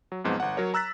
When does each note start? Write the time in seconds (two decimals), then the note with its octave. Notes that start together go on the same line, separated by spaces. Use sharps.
0.12 F#3
0.24 B1 F2 G#2 B3
0.40 G1 F#5
0.57 F#3 A#4 C#5
0.74 A#5 E6 F#6 A6 B6